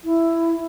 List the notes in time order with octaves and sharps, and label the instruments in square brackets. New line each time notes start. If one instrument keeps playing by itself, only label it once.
[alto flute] E4